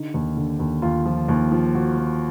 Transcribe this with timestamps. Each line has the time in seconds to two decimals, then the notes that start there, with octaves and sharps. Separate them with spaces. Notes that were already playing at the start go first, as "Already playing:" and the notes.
Already playing: D3 D#4
0.14 D#2
0.37 D3
0.59 D#2
0.82 D#2 F4
1.06 F3
1.28 D#2
1.52 F3
1.74 F3 F#4
1.98 F3